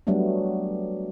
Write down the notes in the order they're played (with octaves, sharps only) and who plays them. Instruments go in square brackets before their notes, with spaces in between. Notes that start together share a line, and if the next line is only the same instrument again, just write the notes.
[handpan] F#3 G3 A3 B3 D4